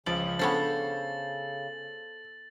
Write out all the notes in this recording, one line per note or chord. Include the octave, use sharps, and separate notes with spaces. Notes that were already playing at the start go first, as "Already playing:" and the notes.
C#2 C#3 F3 D5 F#7
B3 C#4 D4 A4 C5 A6